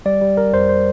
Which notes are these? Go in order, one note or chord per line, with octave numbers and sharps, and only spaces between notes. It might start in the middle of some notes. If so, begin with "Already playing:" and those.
G3 D5
G3
G1 A#4
F2 C5
C5